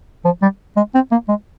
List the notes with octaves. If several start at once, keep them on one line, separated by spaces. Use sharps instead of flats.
F3
G3
G#3
C4
A#3
G#3